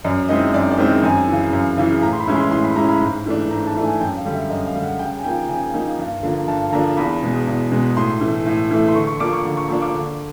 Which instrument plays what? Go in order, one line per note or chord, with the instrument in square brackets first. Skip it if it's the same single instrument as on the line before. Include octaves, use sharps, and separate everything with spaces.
[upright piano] F#2 D5
D#3 G#3 C4 E4 D#5
F#2 D5
D5
D#3 G#3 C4 E4
D#5
F#2 G#5
C#3 E3
F#2
C#3 E3
A2 A#5
C6
B5
E3 G#3 C#4 E4
C6
A2 C6
B5
E3 G#3 C#4 E4 A#5
B5
G#2
E3 A3 D4
G#2 A#5
A5
E3 A3 D4
G#5
F#2 G5
F5
D3 G3
E5
F#2 D#5
F5
D3 G3
F#5
C#3 G5
G#5
F3 A#3 D#4 G5
C#3 G#5
F3 A#3 D#4
G2
D3 F3 A#3 D4
G2 A5
D3 F3 A#3 D4 A#5
E2 B5
B2 G#3
E2
B2 G#3
A2 C6
E3 A3
A2
E3 A3
C6
D3 C#6
C#6
F3 A#3 D4 D6
C#6
D3
C#6
F3 A#3 D4 C#6
D6
D3